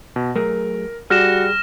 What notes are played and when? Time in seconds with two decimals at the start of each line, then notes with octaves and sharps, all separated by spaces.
0.16 B2
0.36 F#3 A3 G#4 A#4
1.10 G3 F#4 G#4 D5 F6 A#6 E7